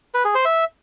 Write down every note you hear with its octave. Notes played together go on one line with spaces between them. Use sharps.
B4
G#4
C5
E5